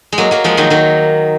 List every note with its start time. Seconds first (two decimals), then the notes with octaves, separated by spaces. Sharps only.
0.12 G#3
0.18 F#3 A#3
0.31 F#3 A#3
0.44 F3 G#3
0.57 D#3 F#3
0.70 D#3 F#3